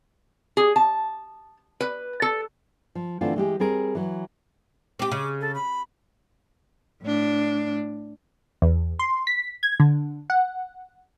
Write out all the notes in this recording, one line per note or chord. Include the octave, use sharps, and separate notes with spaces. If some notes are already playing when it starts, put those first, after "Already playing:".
G#4
A5
B4
A4
F3
D3 E3 A3 C4 F4
E3 G#3 G4
G3 C4 G#4 A#4
E3 F#3
C4 G4 D6
C#3
A4
B5
A2 D4
E2
C6
B6
G#6
D3
F#5